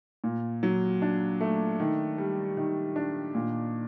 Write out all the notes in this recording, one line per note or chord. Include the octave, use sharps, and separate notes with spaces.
A#2
F#3
D4
A3
D#3
G3
D#3
D4
A#2